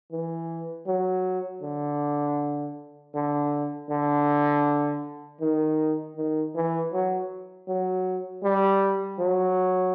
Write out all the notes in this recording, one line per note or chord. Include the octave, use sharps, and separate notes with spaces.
E3
F#3
D3
D3
D3
D#3
D#3
E3
F#3
F#3
G3
F#3